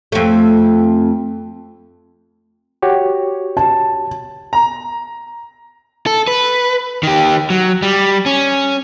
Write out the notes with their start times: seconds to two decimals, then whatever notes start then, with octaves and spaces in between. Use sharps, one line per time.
0.12 F2 A3
2.82 F#4 G4 C#5
3.57 A5
4.53 A#5
6.06 A4
6.28 B4
7.03 D#3 G4
7.50 F#3
7.82 G3
8.26 C#4